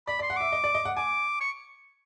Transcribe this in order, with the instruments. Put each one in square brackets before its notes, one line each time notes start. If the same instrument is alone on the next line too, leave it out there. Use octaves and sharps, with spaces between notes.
[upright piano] D5 [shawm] B5
[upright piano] D5
[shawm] C6
[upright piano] F#5
[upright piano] E5 [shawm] D6
[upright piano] D#5
D5
D#5
F#5
[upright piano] G#5 [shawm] D6
[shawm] C#6